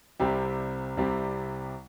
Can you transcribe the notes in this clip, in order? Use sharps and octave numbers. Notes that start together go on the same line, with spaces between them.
C2 C3 G3 C4 G4
C2 C3 G3 C4 G4